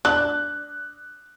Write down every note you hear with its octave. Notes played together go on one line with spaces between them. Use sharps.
D4 F#6